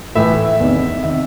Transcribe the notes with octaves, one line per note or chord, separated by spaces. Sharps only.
A2 E3 E5
E2 C3 D#3
C3 D#3 E5